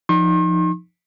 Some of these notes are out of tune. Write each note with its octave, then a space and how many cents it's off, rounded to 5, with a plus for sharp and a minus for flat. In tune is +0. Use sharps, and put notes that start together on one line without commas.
F3 +0 D#4 +0 C6 +45